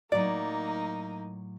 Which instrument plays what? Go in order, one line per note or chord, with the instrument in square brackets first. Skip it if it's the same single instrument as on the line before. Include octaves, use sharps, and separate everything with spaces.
[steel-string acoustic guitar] A2 F#3 [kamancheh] A#3 D#4 [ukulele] D5